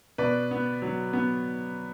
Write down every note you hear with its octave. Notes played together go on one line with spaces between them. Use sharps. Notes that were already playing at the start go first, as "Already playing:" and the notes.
B2 B4 D5
B3
F#3
B3